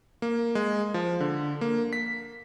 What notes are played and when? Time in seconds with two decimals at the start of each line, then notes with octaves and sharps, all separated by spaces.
0.22 A#3
0.55 G#3
0.94 F3
1.21 D3
1.61 A#3
1.93 B6